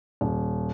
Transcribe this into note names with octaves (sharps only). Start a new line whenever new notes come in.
D#1